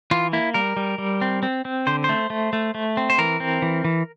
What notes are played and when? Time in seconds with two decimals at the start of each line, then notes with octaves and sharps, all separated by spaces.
0.11 E3 F4
0.33 A#3 E4
0.54 G3 A#4
0.77 G3
0.98 G3
1.21 C4
1.43 C4
1.65 C4
1.87 D3 C5
2.04 C5
2.09 A3
2.30 A3
2.53 A3
2.75 A3
2.97 C4
3.10 C5
3.18 E3 A#4
3.40 C4
3.62 E3
3.85 E3